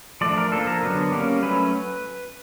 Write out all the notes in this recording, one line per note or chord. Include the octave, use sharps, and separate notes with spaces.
F3 A3 D4 D5
A#4
F3 A#3 D4 A4
A#4
D3 F#3 B3 D4
G3 A#3 C#4
F#3 A3 C#4 B4